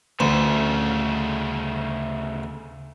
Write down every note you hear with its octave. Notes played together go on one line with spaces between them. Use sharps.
D2 C#3 A3